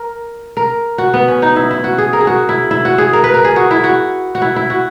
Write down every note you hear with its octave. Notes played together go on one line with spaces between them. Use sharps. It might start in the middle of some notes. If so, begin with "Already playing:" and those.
Already playing: A#4
A#4
F#4
B3
C#4
D#4
E4
E4
F#4
G#4
A#4
G#4
F#4
E4
E4
F#4
G#4
A#4
B4
A#4
G#4
F#4
E4
F#4
F#4
E4
E4
F#4